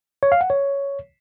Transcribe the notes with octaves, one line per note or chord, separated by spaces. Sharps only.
C#5
F5
F#5
C#5